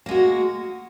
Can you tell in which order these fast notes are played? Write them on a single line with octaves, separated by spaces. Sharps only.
A#3 G#3 F#4